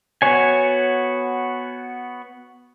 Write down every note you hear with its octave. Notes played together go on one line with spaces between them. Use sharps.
B3 F#4 C#5 G#5